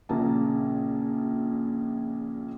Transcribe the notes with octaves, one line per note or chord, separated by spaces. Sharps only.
A#1 A#2 C#3 A#3 A5 A#5